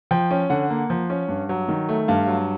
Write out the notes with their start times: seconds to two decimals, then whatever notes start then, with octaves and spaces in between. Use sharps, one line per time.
0.11 F3 G5
0.31 C#4
0.50 D3 F#5
0.70 A#3
0.90 F3
1.10 C#4
1.28 G2
1.49 F#3
1.68 D#3
1.89 A3
2.08 G2 F5
2.28 F#3